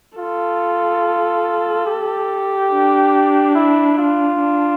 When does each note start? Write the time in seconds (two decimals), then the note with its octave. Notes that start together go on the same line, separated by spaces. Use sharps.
0.18 F4 A4
1.86 G4
2.71 D4
3.55 E4
3.98 F4
4.40 D4